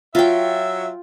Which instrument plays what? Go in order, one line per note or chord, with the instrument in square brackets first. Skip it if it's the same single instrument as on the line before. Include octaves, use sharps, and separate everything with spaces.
[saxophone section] F#3 C#5 E5 [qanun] F4 G5